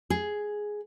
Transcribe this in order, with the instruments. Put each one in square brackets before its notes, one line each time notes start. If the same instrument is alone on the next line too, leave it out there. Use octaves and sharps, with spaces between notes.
[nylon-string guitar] G#4